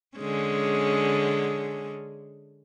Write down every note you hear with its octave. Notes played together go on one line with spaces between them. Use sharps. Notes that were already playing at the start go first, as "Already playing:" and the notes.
D3 G#3 C#4